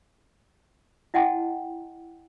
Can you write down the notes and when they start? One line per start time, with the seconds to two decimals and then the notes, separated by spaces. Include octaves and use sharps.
1.14 E4 D#5 F#5 G5 A5 C6